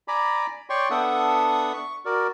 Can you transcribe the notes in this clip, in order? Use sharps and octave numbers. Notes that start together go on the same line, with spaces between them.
D5 G#5 A#5 B5 D6
C#5 D5 G5 C6 C#6
B3 D4 A4 E5 F#5 D#6
C#6
F#4 A#4 D5